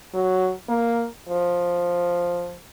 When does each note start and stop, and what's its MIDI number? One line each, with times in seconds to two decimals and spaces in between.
0.14 0.52 54
0.69 1.06 58
1.29 2.58 53